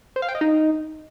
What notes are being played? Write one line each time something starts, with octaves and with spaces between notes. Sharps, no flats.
C5
F5
G5
D#5
D#4